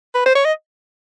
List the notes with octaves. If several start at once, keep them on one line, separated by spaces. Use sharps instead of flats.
B4
C5
C#5
D#5